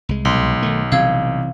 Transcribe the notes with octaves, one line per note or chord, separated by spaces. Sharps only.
C2 G#3
B1 C6
D#3 A3
C3 E3 G3 F5 E6 G#6